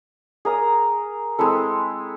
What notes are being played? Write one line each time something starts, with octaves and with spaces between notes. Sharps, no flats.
G#4 A#4 D#6
G#3 C4 E4 A4